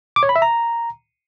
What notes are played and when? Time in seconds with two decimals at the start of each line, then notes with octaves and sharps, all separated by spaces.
0.16 D6
0.23 C#5
0.29 B5
0.36 E5
0.42 A#5